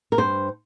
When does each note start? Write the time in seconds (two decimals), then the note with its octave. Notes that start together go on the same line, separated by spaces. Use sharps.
0.12 A#4
0.18 G2 C5